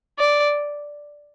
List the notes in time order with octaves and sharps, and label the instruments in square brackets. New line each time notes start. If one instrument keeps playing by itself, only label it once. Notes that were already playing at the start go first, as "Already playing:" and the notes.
[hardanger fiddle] D5